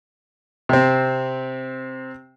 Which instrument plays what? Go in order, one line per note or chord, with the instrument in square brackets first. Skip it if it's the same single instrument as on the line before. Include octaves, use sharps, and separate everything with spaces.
[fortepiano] C3 C4